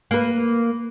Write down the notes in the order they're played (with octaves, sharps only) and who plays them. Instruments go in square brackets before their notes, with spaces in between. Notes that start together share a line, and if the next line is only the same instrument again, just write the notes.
[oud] A#3 B4